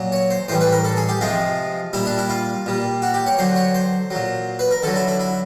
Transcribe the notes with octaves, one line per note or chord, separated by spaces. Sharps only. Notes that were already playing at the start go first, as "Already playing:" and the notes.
Already playing: A#2 F#3
C#5
C5
A2 E3 G3 C5
B4
A#4
A4
G#4
G4
C3 F3 G#3 F4
A#2 G3 E4
D4
E4
F4
A#2 G3
F#4
G4
C#5
D3 F#3 C5
C#5
C5
A#2 F#3
B4
A#4
D3 F#3 A4
E4
E4
E4